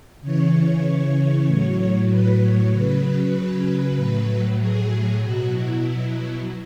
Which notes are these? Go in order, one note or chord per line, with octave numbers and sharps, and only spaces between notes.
C#3 E3 C#5
A2 F#3
B4
C#5
C#3 F#3 B4
A2 F#3
G#4
B2 F#3 F#4
E4